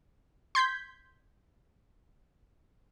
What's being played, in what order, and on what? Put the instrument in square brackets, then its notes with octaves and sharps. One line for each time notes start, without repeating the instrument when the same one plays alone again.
[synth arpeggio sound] C6 G6 G#6 B6